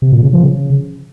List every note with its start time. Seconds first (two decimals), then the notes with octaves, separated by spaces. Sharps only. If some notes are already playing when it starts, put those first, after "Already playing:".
0.02 C3
0.12 A#2
0.23 C#3
0.33 F3
0.43 C#3